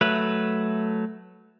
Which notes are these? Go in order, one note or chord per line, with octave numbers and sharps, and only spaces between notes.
F#3 A3 B4